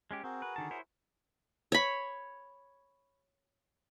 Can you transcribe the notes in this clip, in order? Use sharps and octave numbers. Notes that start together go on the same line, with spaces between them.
G#3 C#4 G4
C4 F#4 G#4 A#4
B4
D3 D#3 A5
E4 C5 C#5
C#5 B5